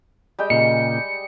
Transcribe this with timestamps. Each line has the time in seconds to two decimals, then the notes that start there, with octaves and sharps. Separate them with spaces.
0.39 G3 G#3 G5
0.50 A#2 C#3 C#7